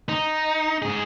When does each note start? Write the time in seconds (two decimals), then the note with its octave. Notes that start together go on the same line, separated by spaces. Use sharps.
0.09 D#4
0.82 G#2 G#4